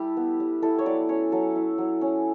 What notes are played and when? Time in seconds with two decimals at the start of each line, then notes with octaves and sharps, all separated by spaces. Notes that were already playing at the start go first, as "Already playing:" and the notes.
Already playing: G3 E4 G4 A4
0.17 B3
0.40 G3
0.62 E4 A4
0.79 C#5
0.86 F#3 D5
1.09 C#4 C#5
1.32 F#3 A4
1.56 E4
1.78 F#3
2.01 C#4